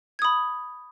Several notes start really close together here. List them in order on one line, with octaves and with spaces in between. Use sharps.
G#6 D#6 B5